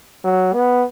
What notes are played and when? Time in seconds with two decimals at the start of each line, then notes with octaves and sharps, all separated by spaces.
0.24 F#3
0.54 B3